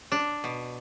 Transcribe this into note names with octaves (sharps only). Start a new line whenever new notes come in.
D4
B2